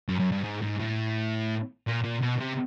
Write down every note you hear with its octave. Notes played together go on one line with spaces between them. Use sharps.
F#2
F#2
G2
G#2
G#2
A2
A#2
A#2
B2
C3